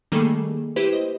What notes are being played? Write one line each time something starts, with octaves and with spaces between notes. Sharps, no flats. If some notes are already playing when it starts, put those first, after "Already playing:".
D#3 G3 A3 A#3 G#4 A4
E4 G4 B4 C5
D#5